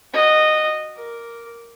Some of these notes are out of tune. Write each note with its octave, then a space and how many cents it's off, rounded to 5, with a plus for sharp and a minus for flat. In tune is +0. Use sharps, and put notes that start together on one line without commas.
F#4 +0 D#5 -10
A#4 +0 D6 -10